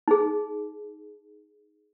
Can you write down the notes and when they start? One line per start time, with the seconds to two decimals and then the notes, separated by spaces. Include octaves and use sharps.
0.08 D#4 G#4